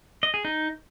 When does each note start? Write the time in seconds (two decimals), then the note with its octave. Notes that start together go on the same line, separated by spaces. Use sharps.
0.23 D#5
0.34 G#4
0.45 D#4